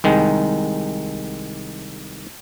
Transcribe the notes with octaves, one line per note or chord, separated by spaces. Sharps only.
C2 D#3 G#3